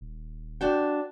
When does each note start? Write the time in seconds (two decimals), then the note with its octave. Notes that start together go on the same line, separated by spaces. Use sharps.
0.01 D#1
0.61 D4 F#4 G5